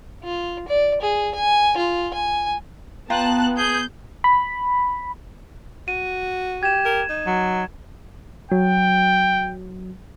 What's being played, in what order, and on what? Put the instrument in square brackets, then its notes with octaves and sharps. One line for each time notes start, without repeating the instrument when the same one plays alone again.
[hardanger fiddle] F4
D5
G#4
G#5
F4
G#5
[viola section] B3 [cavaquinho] F4 G5 A#5 [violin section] A5 F#6
[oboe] G#4 [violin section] G6
[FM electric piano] B5
[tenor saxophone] F#4 [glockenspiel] D#7
[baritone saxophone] G4 [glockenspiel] G#6 E7
[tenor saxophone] A#4
D#4
[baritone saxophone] F#3
[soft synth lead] F#3 [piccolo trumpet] G5